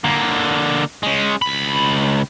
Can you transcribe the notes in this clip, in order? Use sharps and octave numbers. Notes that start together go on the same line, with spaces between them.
D3 A#3
G#3 C#4
C#2 B5